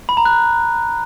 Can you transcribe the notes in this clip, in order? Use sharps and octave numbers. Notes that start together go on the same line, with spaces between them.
B5
A#5
F#6